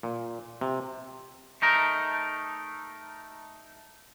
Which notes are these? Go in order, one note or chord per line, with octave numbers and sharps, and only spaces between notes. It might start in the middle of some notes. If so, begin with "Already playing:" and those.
A#2
C3
A3 D#4 A#4